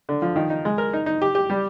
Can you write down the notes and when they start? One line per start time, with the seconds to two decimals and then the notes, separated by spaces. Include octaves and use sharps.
0.09 D3
0.22 F3
0.36 D#3
0.50 D#4
0.65 G#3
0.78 A#4
0.93 D#4
1.06 D#4
1.22 G4
1.35 G4
1.50 G3